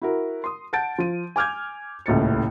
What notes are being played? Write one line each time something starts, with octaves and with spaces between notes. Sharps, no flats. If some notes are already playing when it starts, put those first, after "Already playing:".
E4 F#4 A#4
C6 D#6
F#5 A5 G6 A6 D7
F3 D#7
G#5 D6 F6 G6 G#6
D#1 C#2 A2 A6 C#7